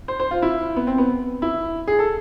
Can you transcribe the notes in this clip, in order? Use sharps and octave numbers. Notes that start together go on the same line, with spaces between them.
C5
C5
F4
E4
B3
C4
B3
E4
G#4
A4